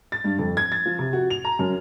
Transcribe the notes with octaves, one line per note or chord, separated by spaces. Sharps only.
A6
G2
F2
G#6
A6
F3
C3
F#4
F7
A#5
F#2